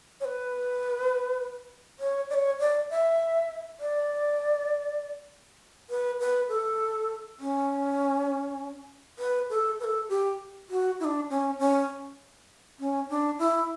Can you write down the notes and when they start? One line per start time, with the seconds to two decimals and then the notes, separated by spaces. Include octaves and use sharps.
0.20 C#5
0.25 B4
2.00 C#5
2.30 D5
2.34 C#5
2.60 D5
2.90 E5
3.80 D5
5.90 B4
6.20 B4
6.49 A4
7.40 C#4
9.19 B4
9.50 A4
9.80 B4
9.84 A4
10.09 G4
10.70 F#4
11.00 E4
11.04 D4
11.30 C#4
11.59 C#4
12.79 C#4
13.09 D4
13.39 E4